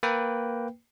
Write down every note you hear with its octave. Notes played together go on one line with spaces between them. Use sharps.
A#3 B4 G5